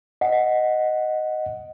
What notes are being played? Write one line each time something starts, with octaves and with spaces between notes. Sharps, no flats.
D#5 F#5